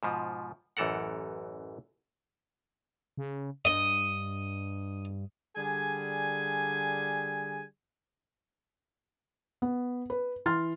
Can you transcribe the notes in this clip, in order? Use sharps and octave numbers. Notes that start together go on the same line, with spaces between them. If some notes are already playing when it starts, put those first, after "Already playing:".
G#2 B2 F3
A1 F#2 E3 A4 A#4 F#5
C#3
G2 D#5
D3 G3 G#4 G#5
B3
B4
E3 C6 F6 A6